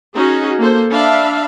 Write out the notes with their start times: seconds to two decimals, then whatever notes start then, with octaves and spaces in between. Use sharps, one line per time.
0.16 C#4 D#4 F#4 G#4
0.59 A#3 A4 C5
0.91 D4 E5 F5 B5